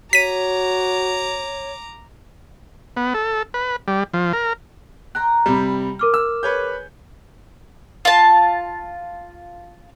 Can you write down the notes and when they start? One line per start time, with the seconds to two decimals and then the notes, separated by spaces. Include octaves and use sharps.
0.13 F#4 C#5 A#5 D6 B6 D#7
2.97 B3
3.14 A4
3.54 B4
3.88 G3
4.14 F3
4.33 A#4
5.15 G5 A#5 C6 F#6
5.46 C3 G3 B5
5.99 A#4 D6 F6
6.14 E6
6.43 G#4 B4 C#5 G6
8.05 F4 A5